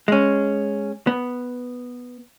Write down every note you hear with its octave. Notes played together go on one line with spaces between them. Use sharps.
G#3 C#4
B3